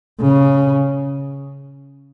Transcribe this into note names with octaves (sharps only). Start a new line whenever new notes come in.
C#3